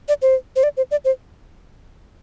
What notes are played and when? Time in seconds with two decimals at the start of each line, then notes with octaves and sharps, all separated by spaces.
0.08 D5
0.22 C5
0.56 C5
0.63 D5
0.77 C5
0.91 D5
1.05 C5